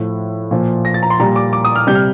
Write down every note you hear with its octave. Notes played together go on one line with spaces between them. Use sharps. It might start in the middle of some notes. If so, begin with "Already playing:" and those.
Already playing: A2 F3
A#2 F3
A#6
A6
A#5
C6
A#2 G3 A#5
D6
D6
D#6
F6
C3 G3 G6
F6